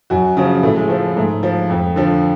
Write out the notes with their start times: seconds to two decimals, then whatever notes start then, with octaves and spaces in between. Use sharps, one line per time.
0.10 F#2 F#4
0.37 C#3 F3
0.63 A2 A3
0.76 G#3
0.88 F3 A3
1.16 G#2 A3
1.43 F3
1.69 F2
1.96 D3 F3